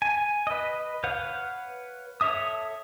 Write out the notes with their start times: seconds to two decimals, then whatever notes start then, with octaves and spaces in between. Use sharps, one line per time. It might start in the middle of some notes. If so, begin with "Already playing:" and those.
0.02 G#5
0.47 B4 D#5
1.04 B4 C#5 F5 F#5 G6
2.21 A4 C#5 E5 D#6